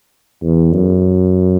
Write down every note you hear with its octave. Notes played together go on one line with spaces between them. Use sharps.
E2
F#2